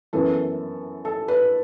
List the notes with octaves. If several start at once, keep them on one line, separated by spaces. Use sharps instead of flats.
F#2 E3 B3 A4
A4
B4